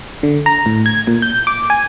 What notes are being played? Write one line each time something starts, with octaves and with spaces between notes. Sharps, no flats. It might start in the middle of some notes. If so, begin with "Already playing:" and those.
D3
A#5
A2
G#6
A#2
G6
D6
G#5